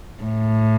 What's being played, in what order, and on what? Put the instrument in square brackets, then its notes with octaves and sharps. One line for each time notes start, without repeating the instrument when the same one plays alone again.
[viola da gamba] A2